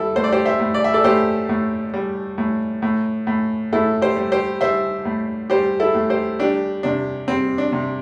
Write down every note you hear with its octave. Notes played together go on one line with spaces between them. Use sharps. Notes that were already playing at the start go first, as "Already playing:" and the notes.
Already playing: G3 E4 A4
A2 C5
D5
G4 C5
C5 E5
A2
D5
E5
A4 D5
A2 G4 C5
A2
G3
A2
A2
A2
A2 E4 A4
G4 C5
G3
G4 C5
G3 C5 E5
A2
G3 G4 C5
E4 A4
A2
G4 C5
G3 D4 G4
C3 D4
G3 C4
D4
C3